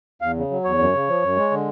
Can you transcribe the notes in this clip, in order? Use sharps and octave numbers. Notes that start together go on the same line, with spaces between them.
E2 F5
C#3
F#3
E2 C#5
F#2
C#3
F3
F#2
G#3
D3